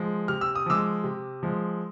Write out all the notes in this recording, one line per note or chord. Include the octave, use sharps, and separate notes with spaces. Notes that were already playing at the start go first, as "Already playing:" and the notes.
Already playing: F3 G#3
C3 F6
E6
D#6
F3 G#3 D6 E6
C3
F3 G#3